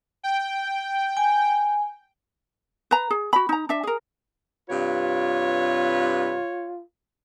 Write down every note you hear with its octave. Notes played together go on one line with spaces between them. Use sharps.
G5
G#5
B4 A#5
G#4
F#4 B5
D#4 A#5
D4 E5
G#4 A#4
G2 C3 F4 B4 C#5